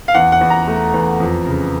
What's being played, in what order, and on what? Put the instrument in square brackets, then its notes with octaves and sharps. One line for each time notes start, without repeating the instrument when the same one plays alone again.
[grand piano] F5
E2 F#5
F#5
E2
A#5
A3
E2
F2
C#3